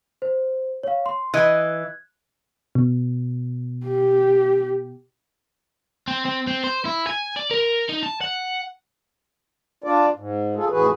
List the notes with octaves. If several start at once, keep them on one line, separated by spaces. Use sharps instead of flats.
C5
C#5 F5
C6
E3 D#5 F#6 G#6
B2
G4
C4
C4
C4
C5
E4
G#5
D5
A#4
D#4
A5
F#5
D4 F4 D5
G#2
F4 G#4 A4
F2 A2 E3 F#4 G#4 B4